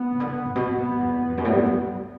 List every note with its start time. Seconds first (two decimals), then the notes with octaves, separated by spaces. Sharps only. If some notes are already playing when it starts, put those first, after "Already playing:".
Already playing: B3
0.12 C#3
0.20 D3
0.27 C#3
0.46 A2
0.55 B2
0.65 A2
0.78 F#2 B3
0.92 F#2
1.00 E2
1.22 F#2
1.30 E2
1.38 F#2
1.45 A2
1.52 G2
1.59 F#2
1.66 G2